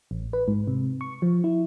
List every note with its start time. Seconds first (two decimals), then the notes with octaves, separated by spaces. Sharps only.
0.11 A1
0.33 B4
0.48 G#2
0.67 C3
1.01 C#6
1.22 F3
1.44 E4